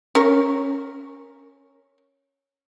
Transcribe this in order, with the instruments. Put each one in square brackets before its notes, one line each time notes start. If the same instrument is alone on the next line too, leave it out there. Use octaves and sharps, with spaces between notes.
[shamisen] C#4 A#4 C#5